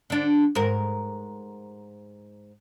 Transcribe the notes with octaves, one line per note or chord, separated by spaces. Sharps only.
D3 D4
G#2 A#4